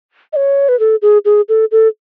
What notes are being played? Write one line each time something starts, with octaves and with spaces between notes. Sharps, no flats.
D#5
C#5
B4
A4
G#4
G#4
A4
A4